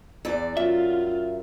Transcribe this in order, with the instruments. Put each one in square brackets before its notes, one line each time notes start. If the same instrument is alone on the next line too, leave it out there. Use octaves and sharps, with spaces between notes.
[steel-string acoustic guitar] E2 E3 D5
[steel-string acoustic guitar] F#2 [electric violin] F4 [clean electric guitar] E5